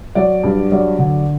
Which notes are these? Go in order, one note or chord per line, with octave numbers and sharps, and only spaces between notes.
F#3 D5
G2
F#3 D5
D3